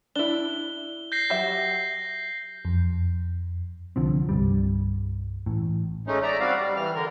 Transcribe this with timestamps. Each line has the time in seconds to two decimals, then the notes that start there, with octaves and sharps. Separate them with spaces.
0.16 D4 E4 G7
1.12 G6 A#6 C7
1.30 F#3 G4 E5
2.65 F2
3.96 C2 D3 F3 C4
4.29 C2 G2 G3
5.46 A1 A2
6.07 G#3 A3 C#4 D#4
6.23 D5 E5 A#5
6.40 G3 C4 F#4 D5 F5
6.59 G3
6.76 E3 F6
6.95 D3 A#4